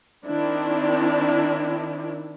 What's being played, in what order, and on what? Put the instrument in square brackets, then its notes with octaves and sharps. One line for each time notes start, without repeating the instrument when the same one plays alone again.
[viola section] D#3 C4 D4 E4